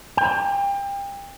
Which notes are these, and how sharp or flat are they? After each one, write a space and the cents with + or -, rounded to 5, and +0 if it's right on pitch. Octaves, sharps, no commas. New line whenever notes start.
G5 +30